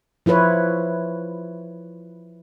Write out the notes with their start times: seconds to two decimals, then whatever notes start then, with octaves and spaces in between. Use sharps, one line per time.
0.26 F3 E4 F4 B4 C#5